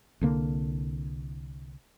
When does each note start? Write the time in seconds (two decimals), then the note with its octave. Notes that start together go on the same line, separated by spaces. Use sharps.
0.21 C2 D3 A#3